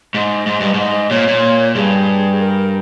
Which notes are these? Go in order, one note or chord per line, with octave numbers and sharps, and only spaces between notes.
G#2 D#5
G#2
G2
G#2 D#5
A#2 C#5
A#2
G2 G#4
A#4